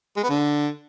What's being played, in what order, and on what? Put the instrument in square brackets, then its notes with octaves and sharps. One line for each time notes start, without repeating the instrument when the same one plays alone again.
[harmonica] G#3
B3
D3